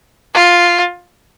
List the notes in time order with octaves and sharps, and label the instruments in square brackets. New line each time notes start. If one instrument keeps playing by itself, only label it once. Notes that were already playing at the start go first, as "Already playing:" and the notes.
[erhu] F4